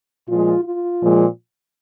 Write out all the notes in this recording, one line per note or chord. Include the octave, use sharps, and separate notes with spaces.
A#2 F3 G#3 F4
F4
A#2 F3 G#3